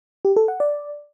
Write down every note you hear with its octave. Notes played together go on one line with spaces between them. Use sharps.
G4
A4
F#5
D5